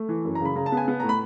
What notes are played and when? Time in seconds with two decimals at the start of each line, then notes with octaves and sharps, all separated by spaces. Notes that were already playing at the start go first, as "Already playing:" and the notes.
Already playing: A3
0.09 E3
0.25 F#2
0.35 A#5
0.40 C#3
0.45 B5
0.55 C#3 A#5
0.66 A5
0.72 B3 G#5
0.88 B3
1.00 A2 A#5
1.09 B5